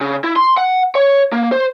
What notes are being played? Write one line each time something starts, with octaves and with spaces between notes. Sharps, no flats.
C#3
E4
C6
F#5
C#5
A#3
C5